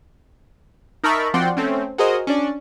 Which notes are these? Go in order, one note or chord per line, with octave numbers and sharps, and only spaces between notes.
D#4 A#4 E5 A5 B5 C#6
F3 C4 F#4 D5 G5 C6
A3 C4 C#4
F#4 G#4 A#4 C5 D#5
C#4 D4 D5